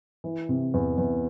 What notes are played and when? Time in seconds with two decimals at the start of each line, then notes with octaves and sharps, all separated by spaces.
0.24 E3
0.49 C3
0.74 E2
0.98 E2